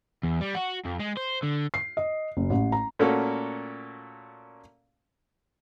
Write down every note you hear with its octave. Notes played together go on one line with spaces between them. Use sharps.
E2
G3
F#4
F2
G#3
C5
D3
C7
D#5
F#1
A1
A#5
A#2 A3 A#3 C#4 F#4 A4